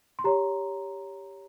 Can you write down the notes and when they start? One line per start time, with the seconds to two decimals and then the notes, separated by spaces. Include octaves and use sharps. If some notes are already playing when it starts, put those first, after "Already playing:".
0.19 C6
0.24 G4 C#5 A#5